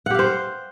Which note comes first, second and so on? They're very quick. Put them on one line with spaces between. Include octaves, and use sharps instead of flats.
F#5 G4 F5 C5